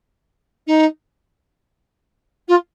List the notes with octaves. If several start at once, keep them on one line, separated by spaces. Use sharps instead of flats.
D#4
F4